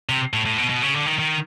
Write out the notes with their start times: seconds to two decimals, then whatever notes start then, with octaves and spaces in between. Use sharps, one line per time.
0.09 C3
0.33 A2
0.46 A2
0.58 B2
0.70 B2
0.82 C#3
0.94 D3
1.06 D#3
1.19 D#3